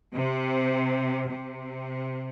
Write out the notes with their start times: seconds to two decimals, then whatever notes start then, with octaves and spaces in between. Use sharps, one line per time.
0.14 C3
1.29 C3